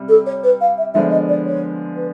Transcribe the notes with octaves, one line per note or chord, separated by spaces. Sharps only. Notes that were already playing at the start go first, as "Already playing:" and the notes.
Already playing: C3 G3
A4
C#5
B4
F5
E5
D3 F3 G#3 B3 D4 E5
D#5
D5
C#5
B4